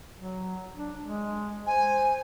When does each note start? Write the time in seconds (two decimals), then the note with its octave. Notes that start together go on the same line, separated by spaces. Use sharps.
0.16 F#3
0.76 D4
1.02 G#3
1.66 C5 G#5